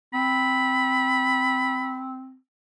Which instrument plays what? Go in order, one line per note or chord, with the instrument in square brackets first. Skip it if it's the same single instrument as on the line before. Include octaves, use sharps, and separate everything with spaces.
[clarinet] C4 [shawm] B5